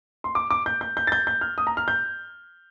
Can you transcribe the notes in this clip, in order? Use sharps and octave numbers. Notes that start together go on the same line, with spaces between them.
C6
D6
D6
G6
G6
G6
A6
G6
G6
F6
D#6
A#5
F6
G6